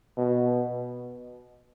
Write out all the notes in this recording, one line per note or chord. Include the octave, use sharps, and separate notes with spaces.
B2